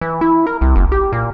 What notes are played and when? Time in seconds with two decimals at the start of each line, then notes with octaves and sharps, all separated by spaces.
0.01 E3
0.21 E4
0.47 A#4
0.61 C2
0.76 F#1
0.92 G4
1.13 A#2